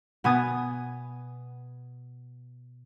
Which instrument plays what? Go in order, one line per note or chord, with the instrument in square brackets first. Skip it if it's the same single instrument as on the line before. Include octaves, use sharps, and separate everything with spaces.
[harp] B2 B3 G#5 D#6 A6